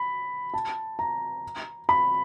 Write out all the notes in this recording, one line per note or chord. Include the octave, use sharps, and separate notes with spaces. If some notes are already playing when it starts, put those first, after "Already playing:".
Already playing: B5
A5
A#5
B5